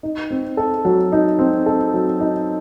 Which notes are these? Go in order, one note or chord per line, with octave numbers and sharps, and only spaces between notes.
D#4
C4
A4
F#3
D#4
C4
A4
F#3
D#4